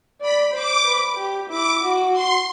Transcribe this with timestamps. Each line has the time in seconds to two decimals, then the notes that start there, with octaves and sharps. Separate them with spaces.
0.21 D5 B5
0.54 C5 D6
0.85 B4
1.17 G4
1.49 E4 D6
1.81 F#4
2.13 C6